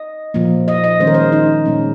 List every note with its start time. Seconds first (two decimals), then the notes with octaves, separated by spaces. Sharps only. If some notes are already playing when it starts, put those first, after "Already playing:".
Already playing: D#5
0.34 A#2 F3 A#3
0.68 D#5
0.84 D#5
1.00 D#3 G#3 C#4 C5
1.07 A#4
1.14 C5
1.32 D#4
1.65 A#2 G#3 C#4